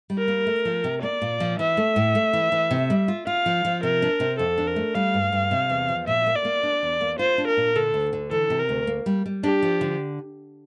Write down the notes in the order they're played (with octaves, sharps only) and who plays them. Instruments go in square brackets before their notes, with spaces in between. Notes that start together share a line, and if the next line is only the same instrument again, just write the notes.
[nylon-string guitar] G3
[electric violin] A#4
[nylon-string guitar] A#3
A3
F3
C3
[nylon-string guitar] A#3 [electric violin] D5
[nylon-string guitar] A#2
F3
[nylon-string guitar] E3 [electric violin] E5
[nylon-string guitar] A3
A2
A3
E3
E3
C3
G3
F4
[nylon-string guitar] F4 [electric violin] F5
[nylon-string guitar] F3
F3
[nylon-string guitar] C3 [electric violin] A#4
[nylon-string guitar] D4
C3
[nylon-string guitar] F2 [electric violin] A4
[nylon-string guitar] D4
[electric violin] A#4
[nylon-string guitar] A3
[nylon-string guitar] G3 [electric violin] F5
[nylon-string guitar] G2
G2
C3
E2
F3
[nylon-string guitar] A#2 [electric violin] E5
[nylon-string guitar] A#3
[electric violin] D5
[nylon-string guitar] A#3
D4
E2
A#3
[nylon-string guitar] F4 [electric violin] C5
[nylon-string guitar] D4
[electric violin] A#4
[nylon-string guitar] A#2
[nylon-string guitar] D3 [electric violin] A4
[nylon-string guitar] D2
D3
[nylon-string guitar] E3 [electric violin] A4
[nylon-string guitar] C3
[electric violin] A#4
[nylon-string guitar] D2
A#3
G3
G3
[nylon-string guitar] D4 [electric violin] G4
[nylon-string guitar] F3
D3